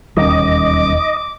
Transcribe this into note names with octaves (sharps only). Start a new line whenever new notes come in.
E1 D#2 D#3 G3 C#4 D#5 D6